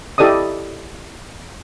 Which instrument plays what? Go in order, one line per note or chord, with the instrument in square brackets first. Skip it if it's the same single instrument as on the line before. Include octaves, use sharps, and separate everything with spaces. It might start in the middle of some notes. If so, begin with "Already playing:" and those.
[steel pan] E4 G4 A4 D5 D#5 D#6